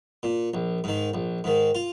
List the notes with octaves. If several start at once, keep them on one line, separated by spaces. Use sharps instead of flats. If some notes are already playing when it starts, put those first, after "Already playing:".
A#2
A#1
G#2 D#3
A#1
G#2 D#3
F4